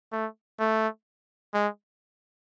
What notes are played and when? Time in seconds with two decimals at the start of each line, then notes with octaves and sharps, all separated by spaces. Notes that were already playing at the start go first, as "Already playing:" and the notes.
0.12 A3
0.59 A3
1.54 G#3